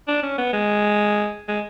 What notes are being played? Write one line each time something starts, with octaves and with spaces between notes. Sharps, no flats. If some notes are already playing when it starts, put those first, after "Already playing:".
D4
C#4
B3
G#3
G#3